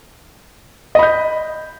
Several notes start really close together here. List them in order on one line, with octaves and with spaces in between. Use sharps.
D#5 B5 G6